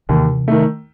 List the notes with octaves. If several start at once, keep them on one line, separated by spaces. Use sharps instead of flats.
D#2 C3 E3
D#3 A3